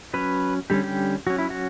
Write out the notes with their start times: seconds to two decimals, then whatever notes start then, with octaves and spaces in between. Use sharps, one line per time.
0.14 F#3 C#4 B4
0.70 D3 G3 C#4 G4
0.84 G4
1.27 F#3 C#4 F#4
1.39 E4
1.50 F#4